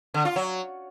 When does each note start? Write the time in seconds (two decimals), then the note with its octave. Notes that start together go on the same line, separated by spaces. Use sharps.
0.14 D3
0.25 F4
0.36 F#3